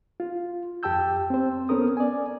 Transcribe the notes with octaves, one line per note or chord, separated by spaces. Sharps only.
F4
F2 G4 G5 A5 E6 G6
C4 C5
B3 C#4 A4 A#4 D#6
D5 G#5